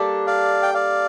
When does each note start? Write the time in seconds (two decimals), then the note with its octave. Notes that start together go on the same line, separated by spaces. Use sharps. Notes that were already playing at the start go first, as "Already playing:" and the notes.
Already playing: G3 A#3 D4 A4
0.27 D5 F5
0.63 G5
0.74 D5 F5